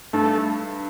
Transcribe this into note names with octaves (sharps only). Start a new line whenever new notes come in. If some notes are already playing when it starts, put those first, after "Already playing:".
G2 A3